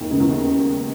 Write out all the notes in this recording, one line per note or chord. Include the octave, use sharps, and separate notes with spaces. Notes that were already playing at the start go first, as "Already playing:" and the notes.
D#2 D#3
C#2 C#3
E2 E3
D#2 D#3